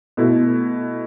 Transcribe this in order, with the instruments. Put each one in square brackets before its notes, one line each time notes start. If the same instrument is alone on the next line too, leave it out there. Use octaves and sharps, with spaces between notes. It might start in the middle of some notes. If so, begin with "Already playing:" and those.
[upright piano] B2 A3 E4